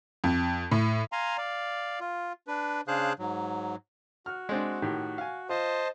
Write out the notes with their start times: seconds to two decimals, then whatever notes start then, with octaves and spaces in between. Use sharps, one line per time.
0.24 F2
0.71 A2
1.12 F5 G#5 A#5 C6
1.37 D5 F5
2.00 F4
2.47 D4 B4
2.88 C#3 D4 G#4 C5 F5 F#6
3.19 G#2 F#3
4.26 F#4 F6
4.49 G#3 C4 D4
4.82 A2 D#3 G4
5.18 F5 G#5
5.49 F4 C5 D#5 A5